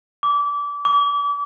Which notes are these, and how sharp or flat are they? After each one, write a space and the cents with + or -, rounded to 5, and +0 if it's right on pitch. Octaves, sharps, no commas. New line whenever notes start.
D6 -25
D6 -35